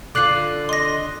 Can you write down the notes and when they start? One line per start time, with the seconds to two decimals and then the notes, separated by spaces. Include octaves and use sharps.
0.15 D3 F4 D6 F#6 C7
0.69 D#5 C6 A#6